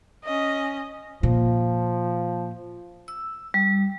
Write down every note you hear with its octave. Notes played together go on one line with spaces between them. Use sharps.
C#4 D#5
A#2 F3
E6
G3